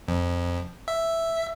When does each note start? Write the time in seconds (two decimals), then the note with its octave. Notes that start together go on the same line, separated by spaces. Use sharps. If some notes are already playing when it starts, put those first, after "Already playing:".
0.08 F2
0.88 E5